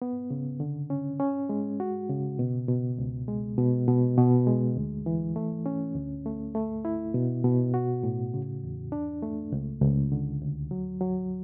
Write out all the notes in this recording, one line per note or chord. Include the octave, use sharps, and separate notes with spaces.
B3
C#3
D3
C#4
C#4
G#3
F#4
C#3
B2
B2
C#2
G#3
B2
B2
B2
G#3
D2
E3
A3
C#4
D2
A3
A3
E4
B2
B2
F#4
A2
C#3
E2
D4
A3
C#2
C#2
D3
D2
F#3
F#3